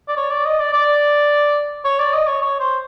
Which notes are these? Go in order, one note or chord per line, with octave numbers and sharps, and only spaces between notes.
D5
C#5
D5
D#5
D5
D5
C#5
D5
D#5
C#5
C#5
C5